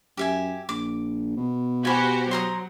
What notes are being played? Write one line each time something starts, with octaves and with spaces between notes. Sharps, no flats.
F#2 G4 E5 G#5
A#1 D6
B2
F#4 G4 C5 G#5 B5
F#3 C5 A#5 D#6